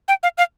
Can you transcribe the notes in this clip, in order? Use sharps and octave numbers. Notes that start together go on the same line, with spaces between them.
G5
F5
F5